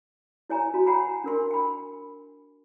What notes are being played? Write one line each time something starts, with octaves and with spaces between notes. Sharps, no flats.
E4 C#5 G#5 A#5
F#4
C#5 F#5 G#5 A#5 B5
D4 A#4 C6
G5 B5